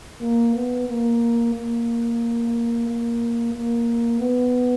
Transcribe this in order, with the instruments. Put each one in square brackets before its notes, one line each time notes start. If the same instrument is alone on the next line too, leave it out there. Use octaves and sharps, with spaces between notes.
[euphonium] A#3
B3
A#3
A#3
A#3
A#3
B3